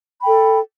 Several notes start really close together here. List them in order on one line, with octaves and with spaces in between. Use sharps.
B5 G5 A4